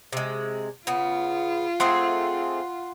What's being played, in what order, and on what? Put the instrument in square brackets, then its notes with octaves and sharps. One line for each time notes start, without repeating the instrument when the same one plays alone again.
[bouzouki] C3 G#3
[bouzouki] C#3 B3 [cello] F4
[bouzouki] A3 C4 G#4 [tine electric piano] F#5 C6